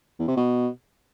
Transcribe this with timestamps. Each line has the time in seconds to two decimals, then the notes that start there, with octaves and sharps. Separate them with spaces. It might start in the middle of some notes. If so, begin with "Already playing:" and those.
0.19 E2
0.28 C3
0.37 B2